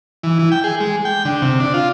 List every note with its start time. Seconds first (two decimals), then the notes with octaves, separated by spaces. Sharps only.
0.23 E3
0.39 E3
0.52 G5
0.64 G#4
0.80 G#3
1.05 G5
1.25 D3
1.42 C3
1.60 D4
1.74 F4